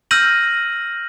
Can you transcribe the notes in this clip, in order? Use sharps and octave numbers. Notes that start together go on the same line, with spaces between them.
E6 F6 G6 A#6 D#7 F#7